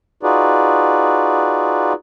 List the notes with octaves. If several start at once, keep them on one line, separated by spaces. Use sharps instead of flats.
D#4 F4 F#4 G#4 B4 D5